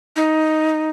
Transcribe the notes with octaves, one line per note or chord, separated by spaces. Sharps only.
D#4